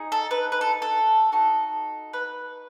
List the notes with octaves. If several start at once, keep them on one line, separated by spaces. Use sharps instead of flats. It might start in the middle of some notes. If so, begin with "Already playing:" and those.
Already playing: D#4 G#4
A4
B4
B4
A4
A4
D#4 F#4 A4
B4